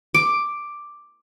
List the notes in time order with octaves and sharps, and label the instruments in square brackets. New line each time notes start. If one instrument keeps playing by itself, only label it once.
[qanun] D6